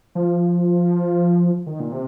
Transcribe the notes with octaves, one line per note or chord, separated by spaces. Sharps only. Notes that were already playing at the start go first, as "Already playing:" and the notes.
F3
D#3
A#2
C3